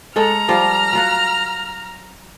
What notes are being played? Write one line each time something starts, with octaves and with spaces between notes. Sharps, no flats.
G#3 A4 C#5 A#5 F6
F3 G3 F4
F#3 F4 F#5